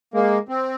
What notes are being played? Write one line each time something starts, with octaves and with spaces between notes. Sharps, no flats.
G#3 A#3
C4